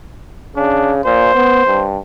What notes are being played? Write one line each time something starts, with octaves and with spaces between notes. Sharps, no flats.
C#3 D4
A#2 C5
B3
G2